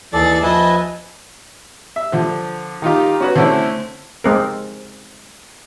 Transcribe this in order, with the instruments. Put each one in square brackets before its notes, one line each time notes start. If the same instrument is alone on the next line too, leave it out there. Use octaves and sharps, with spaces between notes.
[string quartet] D#2 G#4 A6 [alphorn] E3 [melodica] A4 D5
[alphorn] F3 [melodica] B4 E5 G#5 [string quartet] D#5 A5
[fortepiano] E5
D3 F3
D#3 D#4 F4 G4
C#4 F#4 B4
D3 A3 C4 C#4 E4
[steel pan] G#3 C4 A#4